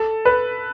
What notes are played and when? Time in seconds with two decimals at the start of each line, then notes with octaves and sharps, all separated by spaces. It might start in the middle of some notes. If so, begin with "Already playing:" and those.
Already playing: A4
0.25 B4